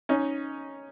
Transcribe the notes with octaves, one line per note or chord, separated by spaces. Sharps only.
C#4 D#4